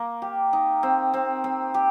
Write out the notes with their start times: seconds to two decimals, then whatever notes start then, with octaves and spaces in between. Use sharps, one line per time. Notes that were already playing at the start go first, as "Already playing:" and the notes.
Already playing: A#3
0.22 G4
0.53 D#4
0.83 C4
1.14 C4
1.44 C4
1.74 G4